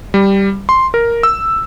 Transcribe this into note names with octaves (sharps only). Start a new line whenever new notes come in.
G3
C6
A#4
E6